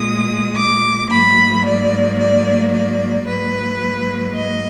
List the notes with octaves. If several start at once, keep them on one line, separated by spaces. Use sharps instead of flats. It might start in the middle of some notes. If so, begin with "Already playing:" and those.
Already playing: A#2 G#3 D#6
D6
G#2 F#3 A#3 B5
D5
D5
D5
G#2 F#3 A#3 B4
D#5